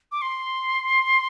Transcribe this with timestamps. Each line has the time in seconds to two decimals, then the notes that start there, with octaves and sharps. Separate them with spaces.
0.12 D6
0.22 C6